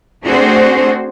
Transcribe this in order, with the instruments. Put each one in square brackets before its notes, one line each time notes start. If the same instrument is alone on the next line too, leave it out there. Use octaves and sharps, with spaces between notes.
[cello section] A3 C4 D4 F#4 G#4 C5